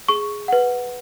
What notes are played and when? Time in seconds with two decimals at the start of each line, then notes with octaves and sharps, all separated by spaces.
0.09 G#4 C#6
0.48 B4 F#5